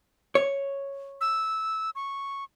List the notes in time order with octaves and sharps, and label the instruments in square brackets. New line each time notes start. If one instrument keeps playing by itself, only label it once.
[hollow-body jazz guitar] C#5
[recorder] E6
C#6